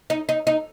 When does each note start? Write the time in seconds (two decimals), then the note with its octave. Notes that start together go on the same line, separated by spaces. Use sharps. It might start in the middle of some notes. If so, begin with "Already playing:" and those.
0.10 D#4
0.29 D#4
0.47 D#4